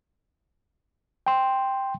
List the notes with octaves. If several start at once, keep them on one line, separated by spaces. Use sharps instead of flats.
G5 C6